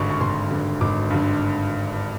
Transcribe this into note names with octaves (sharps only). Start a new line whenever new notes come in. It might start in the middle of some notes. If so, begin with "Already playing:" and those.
Already playing: G#1 G2 D3 C#6
C#6
G#1 C6
G2 D3
G#1 D6
G2 D3